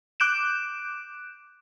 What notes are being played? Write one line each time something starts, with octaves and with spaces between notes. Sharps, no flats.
D6 F#6 G6 D7 E7